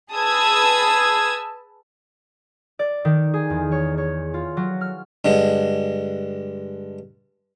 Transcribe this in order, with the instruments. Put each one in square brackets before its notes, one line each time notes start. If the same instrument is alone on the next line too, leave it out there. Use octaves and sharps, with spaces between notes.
[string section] G#4 B4 A5 D#6 E6 G#6
[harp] D5
D#3
G#4
E2
C#5
C#5
F4
F#3
F6
[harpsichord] G2 D3 G#3